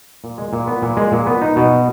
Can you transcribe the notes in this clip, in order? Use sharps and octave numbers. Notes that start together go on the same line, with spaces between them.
A#2
G#3
A#2
B3
A#2
G#3
A#2
B3
D#4
B2